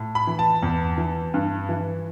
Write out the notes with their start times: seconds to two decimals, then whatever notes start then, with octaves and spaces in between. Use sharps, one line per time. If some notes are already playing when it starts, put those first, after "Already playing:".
Already playing: A2
0.15 B5
0.27 E3
0.39 A5
0.63 E2
0.98 E3
1.34 G2
1.69 E3